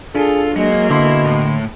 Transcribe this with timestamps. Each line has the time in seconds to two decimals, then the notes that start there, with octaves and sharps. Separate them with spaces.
0.15 D4 F4 G#4 A4
0.56 F#3 G#3 A#3
0.90 B2 D3 E4 C6
1.24 A2